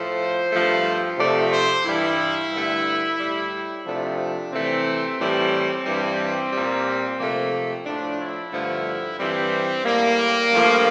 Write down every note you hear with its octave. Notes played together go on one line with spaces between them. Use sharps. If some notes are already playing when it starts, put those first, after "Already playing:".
Already playing: A2 F3 A3 C5
G2 F3 A3
C3 F3 A3 D5
C5
G2 E3 G3 E4
G2 D3 A3
A2 G3
C3 F3 A3 D4
C3 E3 A3 C4
A2 E3 G3
G2 E3 G3
G3
A#2
C3 F3 A3 A#3
A2 F3 A3 D4
E4
G2 D3 F3 A3
G2 E3 G3 C4
A2 G3 A#3
G2 F3 A3